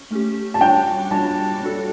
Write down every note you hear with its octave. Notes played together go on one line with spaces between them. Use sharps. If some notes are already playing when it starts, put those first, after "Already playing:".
Already playing: C#4
A3 C#4 G4
A5
G3 D4 F#4 C#5 G5
G3 D4 F#4 C#5 A5
G3 D4 F#4 A4